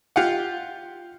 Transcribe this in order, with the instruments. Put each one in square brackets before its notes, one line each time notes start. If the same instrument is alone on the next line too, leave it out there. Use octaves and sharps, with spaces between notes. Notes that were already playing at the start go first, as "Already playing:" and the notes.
[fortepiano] F4 G4 F#5